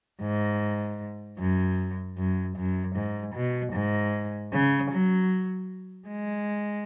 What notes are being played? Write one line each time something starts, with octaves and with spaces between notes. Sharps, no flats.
G#2
F#2
F#2
F#2
G#2
B2
G#2
C#3
F#3
G#3